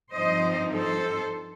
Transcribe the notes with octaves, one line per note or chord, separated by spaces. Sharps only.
G2 F3 C4 D#4 C5 D#5
A4 C5